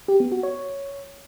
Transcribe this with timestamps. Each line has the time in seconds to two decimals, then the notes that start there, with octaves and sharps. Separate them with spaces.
0.08 G4
0.20 B3
0.32 F#4
0.43 C#5